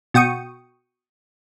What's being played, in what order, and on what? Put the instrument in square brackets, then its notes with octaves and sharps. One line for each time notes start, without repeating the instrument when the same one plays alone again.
[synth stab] B2 F#4 G5 C#6 D#6